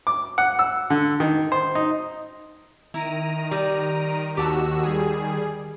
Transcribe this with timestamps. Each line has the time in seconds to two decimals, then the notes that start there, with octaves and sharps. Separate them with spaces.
0.07 D6
0.38 F#5
0.59 E6
0.90 D3
1.20 D#3
1.52 C5
1.75 D#4
2.94 D#3 E4 A#5 D7 D#7
3.51 G3
4.37 D#2 F#4 G4 A5 E6
4.83 G3 G#4